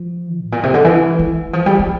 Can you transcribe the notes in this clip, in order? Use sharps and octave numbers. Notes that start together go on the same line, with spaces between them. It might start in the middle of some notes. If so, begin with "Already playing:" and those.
Already playing: F3
A2
A#2
C3
D3
E3
E3
F3
G3
F3